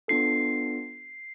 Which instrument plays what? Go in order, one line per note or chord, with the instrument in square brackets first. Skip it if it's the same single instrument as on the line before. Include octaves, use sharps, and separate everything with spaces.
[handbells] B3 D4 F4 A4 [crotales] C7